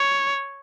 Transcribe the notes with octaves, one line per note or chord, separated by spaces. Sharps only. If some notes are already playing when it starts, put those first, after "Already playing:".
Already playing: C#5